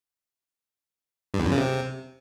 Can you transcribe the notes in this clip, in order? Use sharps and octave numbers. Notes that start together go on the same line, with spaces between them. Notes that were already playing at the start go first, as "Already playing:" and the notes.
G2
E2
F#2
C#3
C3